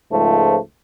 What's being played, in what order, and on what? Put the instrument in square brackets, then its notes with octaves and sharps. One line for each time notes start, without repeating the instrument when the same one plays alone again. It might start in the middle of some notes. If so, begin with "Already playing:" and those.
[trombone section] C#2 G#2 F3 A3